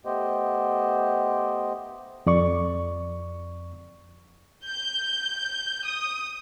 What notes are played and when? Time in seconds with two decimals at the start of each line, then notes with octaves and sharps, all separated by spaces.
0.05 A3 B3 G4 C5 D#5
2.26 F2 D5 C#6
4.65 G6
5.85 D#6